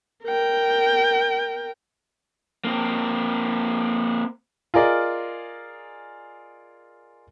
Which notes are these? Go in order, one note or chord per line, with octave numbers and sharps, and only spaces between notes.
A#4 G5
A#3 C4
F4 G#4 A#4 D5 D#5